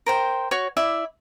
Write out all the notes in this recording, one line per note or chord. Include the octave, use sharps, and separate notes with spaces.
A#4 C5 G5
F#4 C#5 C#6
E4 D5 E5